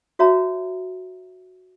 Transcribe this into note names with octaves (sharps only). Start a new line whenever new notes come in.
F#4 C#5 E5 A#5